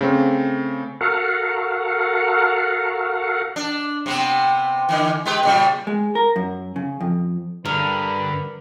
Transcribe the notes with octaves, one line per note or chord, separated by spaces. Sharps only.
C#3 A3 C4
F#4 A4 A#4 F5 F#5
D4
C3 B3 C4
D3 E3
G#3 G4 B4
A#2 C#3 G3
G#3
A#4
F#2
C#3
F2
G2 D3 A#4 B4